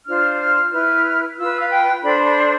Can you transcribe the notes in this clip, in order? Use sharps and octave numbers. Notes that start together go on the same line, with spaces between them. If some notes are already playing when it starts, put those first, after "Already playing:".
D4 F4 C5 F6
F6
E4 B4 F6
F4 B4 E6
F5
G5
D4 A4 C5 B5
B5